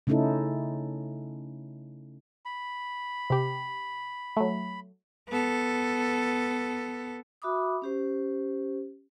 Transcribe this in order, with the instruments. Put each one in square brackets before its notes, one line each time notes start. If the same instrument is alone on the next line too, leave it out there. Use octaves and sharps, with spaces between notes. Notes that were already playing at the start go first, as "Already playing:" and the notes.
[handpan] C#3 A3 C#4 D#4 E4 A4
[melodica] B5
[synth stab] C3 G4
F#3 A3
[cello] B3 A4
[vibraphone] F#4 E5 B5 D6 D#6
C#4 G4 C5